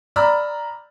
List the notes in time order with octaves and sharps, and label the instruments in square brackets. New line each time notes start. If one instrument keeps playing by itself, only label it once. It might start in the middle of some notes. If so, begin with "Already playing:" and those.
[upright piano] D5 A#5 B5 E6 F6